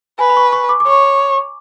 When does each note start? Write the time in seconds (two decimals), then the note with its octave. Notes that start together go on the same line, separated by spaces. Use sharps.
0.19 B4 G#5
0.30 B5
0.37 C#6
0.53 C#6
0.69 D6
0.80 D6
0.86 C#5 C#6